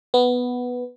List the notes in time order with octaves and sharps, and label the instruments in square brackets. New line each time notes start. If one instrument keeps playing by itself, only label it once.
[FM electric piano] B3